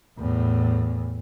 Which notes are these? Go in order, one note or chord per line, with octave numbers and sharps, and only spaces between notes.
E2 A2